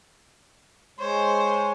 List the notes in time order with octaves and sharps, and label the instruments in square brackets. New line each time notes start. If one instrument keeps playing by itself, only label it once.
[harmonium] G#3 C#5 [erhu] C5